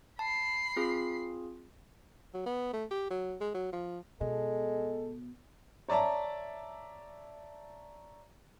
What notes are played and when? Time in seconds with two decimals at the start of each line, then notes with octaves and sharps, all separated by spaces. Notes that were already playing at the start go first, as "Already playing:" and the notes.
0.19 A5 B5 C7
0.76 C4 F4 G#4
2.34 F#3
2.46 B3
2.73 A3
2.91 G4
3.11 F#3
3.41 G#3
3.54 F#3
3.73 F3
4.21 B2 G#3 A4
5.88 C#5 D5 E5 A5 A#5